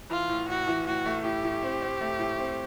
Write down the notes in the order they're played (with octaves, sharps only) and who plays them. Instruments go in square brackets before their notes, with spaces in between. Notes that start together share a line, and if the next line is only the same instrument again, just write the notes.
[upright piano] E3 [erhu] F4
[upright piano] A2
[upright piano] A2 [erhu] F#4
[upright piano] E3
[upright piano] A2 [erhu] F#4
[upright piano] A3
[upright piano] A2 [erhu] G4
[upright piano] A2
C4
C4
A3
A2
C4